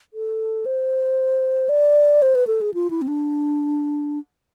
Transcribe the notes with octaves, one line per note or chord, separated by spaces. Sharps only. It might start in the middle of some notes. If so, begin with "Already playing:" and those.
A4
C5
D5
C5
B4
A4
G#4
F4
E4
C4
D4